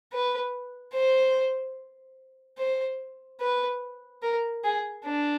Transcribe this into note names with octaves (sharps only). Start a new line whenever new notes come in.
B4
C5
C5
B4
A#4
G#4
D4